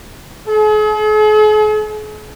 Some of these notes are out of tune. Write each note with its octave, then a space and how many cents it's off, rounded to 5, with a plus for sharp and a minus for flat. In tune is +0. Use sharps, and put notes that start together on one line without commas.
G#4 +45